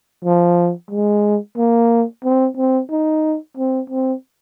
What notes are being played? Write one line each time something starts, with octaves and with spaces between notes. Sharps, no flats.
F3
G#3
A#3
C4
C4
D#4
C4
C4